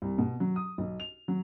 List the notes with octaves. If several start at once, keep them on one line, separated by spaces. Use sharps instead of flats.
C2
B2
F#3
D#6
B1
F7
F#3